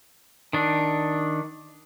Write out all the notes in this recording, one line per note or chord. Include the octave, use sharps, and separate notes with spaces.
D#3 D4